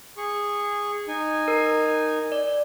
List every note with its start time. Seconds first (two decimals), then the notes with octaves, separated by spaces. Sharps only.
0.17 G#4 C#6
1.08 D#4 G#5
1.48 A#4
2.32 D5